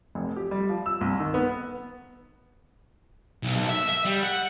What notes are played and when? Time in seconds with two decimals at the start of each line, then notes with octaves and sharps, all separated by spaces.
0.15 F1
0.36 G4
0.51 G3
0.69 F3
0.86 E6
1.01 C2
1.20 D#3
1.34 B3
3.43 B1
3.56 B1
3.68 E5
3.89 E5
4.05 G3
4.23 F#5